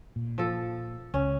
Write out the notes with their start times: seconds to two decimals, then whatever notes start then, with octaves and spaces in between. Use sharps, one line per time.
0.16 A#2
0.38 F3 A4
1.14 C#2 C#4